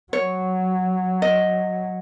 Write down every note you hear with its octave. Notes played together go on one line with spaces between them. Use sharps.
F#3 C#5
D#5